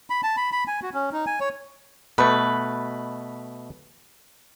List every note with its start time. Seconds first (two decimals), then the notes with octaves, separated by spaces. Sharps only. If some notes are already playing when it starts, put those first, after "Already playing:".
0.10 B5
0.23 A5
0.37 B5
0.52 B5
0.67 G#5
0.82 F#4
0.94 C#4
1.12 D#4
1.27 G#5
1.40 C#5
2.18 B2 A3 B4